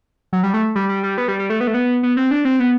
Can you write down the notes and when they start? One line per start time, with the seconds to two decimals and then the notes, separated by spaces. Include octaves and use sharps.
0.33 F#3
0.43 G3
0.54 A3
0.75 G3
0.89 G3
1.03 G3
1.18 B3
1.28 G3
1.39 G3
1.50 A3
1.60 B3
1.67 A3
1.74 B3
2.03 B3
2.17 C4
2.31 D4
2.45 C4
2.60 B3